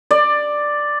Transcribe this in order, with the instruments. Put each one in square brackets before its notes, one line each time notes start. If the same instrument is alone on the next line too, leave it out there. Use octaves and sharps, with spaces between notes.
[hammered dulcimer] D5